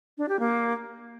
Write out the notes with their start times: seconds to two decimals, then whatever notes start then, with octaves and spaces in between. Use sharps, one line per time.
0.18 D4
0.29 G4
0.40 A#3